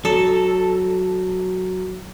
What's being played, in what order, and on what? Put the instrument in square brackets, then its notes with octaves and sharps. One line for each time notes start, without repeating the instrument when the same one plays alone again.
[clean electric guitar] F#3 [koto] A4